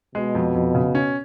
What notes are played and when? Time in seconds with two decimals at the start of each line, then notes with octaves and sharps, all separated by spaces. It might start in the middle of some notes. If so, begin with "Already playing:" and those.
0.15 B2 G#3
0.35 F2
0.55 F2
0.75 C#3
0.95 C#4